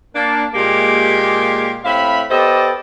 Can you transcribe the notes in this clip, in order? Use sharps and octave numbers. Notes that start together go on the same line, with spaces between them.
A#3 D4
A#2 G#3 A#3 G4
A2 C4 E5 F5 B5
B3 G4 A4 C5 D5 D#5